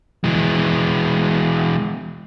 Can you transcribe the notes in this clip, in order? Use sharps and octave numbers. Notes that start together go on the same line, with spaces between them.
E3 G#3